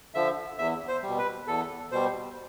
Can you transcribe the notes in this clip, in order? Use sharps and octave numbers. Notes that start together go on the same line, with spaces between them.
D3 F3 E5
E2 E5
C5
G3
B2
B4
E2 A4
B2 G3 C5